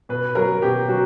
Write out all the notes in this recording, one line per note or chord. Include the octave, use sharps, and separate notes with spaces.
B2 B4
F#3 A#4
B2 G4
F#3 F#4